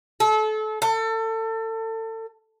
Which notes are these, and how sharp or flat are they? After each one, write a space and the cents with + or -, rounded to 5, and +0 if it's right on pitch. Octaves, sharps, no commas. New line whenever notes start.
A4 -30
A4 +30